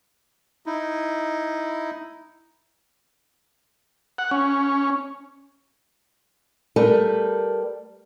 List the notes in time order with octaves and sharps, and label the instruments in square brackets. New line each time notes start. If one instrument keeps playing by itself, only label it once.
[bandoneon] D#4 E4
[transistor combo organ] F#5
C#4
[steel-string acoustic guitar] G3 A3 A#4 B4